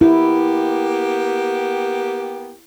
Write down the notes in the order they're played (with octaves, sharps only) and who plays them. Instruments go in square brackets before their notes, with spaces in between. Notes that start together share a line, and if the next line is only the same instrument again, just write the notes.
[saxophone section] A#3 B3 G4 [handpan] E4